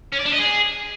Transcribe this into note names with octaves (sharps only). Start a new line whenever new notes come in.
C#4
D5
D4
D#5
G#4